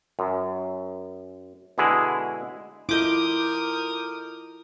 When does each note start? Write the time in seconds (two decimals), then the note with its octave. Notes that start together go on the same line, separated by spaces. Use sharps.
0.19 F#2
1.78 B2 D3 G#3 E4 G#4
2.89 E4 F4 A4 A#4 D#5 D6 D#6 G6